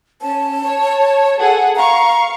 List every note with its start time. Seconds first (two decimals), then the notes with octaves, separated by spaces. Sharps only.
0.21 C#4 A5
0.64 C#5
1.38 G#4 A4 F#5
1.76 F5 A#5 C#6